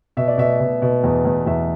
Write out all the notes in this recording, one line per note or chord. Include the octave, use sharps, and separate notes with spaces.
B2 E5
D5
B2 E5
B2
B2
E2
E2
E2 E5